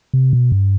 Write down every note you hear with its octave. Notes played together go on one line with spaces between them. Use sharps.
C3
B2
G2